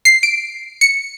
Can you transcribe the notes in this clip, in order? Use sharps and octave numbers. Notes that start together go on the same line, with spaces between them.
C7
D7
C#7